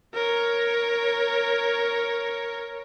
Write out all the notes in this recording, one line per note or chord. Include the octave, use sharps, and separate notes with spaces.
A#4 C#5